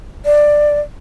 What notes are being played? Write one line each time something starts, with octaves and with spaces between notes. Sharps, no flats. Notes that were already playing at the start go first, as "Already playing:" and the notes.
D5